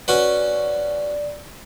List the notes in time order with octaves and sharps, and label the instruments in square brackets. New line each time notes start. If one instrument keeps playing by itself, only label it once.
[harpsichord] C#4 F#4 B4 [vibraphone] D5